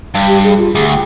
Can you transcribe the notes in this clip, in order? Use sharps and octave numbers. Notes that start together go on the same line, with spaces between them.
G2
G4
G#4
F4
D2 G#4
G5